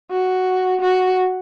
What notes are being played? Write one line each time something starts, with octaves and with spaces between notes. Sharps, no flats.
F#4
F#4